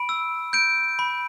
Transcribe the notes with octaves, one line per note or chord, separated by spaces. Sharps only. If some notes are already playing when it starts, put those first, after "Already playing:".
Already playing: B5 D7
E6
G6 D7
B5